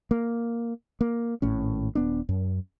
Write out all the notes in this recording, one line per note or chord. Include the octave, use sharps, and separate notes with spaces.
A#3
A#3
G#1 A2 C#4
D#1 B3 D4
F#2